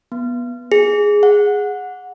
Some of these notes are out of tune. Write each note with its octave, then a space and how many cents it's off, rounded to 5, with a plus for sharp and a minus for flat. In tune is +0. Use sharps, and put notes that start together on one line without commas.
B3 -20
G#4 -5
F#5 -15